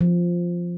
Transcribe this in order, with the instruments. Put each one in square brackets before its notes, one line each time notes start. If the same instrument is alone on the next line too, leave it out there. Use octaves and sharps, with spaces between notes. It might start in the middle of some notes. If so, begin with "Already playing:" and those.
[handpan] F3